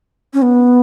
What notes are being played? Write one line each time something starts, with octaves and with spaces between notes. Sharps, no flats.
C#4
B3